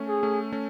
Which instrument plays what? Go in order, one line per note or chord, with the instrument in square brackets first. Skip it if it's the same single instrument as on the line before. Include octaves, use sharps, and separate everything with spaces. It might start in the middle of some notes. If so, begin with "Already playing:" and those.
Already playing: [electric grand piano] A3 C#4
[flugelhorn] G#4
[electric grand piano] A3 C#4
A3 C#4